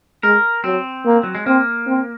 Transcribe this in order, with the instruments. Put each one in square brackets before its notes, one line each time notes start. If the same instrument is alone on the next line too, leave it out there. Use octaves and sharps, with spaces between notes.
[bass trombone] G#3 [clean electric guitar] A#4
[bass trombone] F#3 [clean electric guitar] C4
[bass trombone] A#3
[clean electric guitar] F#3
G#3
[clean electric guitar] A#3 [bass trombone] C4
[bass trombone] C4